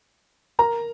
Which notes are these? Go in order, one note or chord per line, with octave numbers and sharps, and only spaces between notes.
A#4 A#5